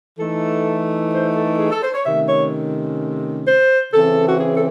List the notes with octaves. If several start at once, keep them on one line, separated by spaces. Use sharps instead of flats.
E3 A3 D#4 A4
C5
A4
G#4
A4
C5
C#5
C3 D#3 A3 C#4 E5
C#5
C5
C#3 E3 C4 A4
F#4
G#4
A4